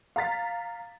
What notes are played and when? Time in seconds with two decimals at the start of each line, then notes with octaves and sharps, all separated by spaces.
0.16 F5 A#5 A6 B6